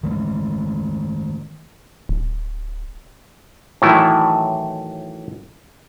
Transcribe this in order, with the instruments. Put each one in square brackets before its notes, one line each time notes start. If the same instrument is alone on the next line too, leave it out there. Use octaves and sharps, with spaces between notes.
[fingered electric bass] D#3 G#3 A3
[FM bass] D1
[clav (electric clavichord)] A2 D#3 E3 F#3 A3 E4